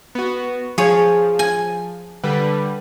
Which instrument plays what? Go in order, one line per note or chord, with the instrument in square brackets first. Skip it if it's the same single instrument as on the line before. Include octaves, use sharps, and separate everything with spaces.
[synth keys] B3 F#4
[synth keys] F3 [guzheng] G#4 C#5
[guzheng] G#5
[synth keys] D3 G3 B4